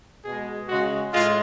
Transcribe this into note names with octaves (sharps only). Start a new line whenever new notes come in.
B2 G#3 G#4
C#3 G#3 F#4
A2 G#3 F4